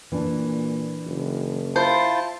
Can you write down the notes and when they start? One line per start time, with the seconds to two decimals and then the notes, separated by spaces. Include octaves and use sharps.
0.12 A#2 E3 D4
1.06 F#1
1.76 E4 F4 C5 A5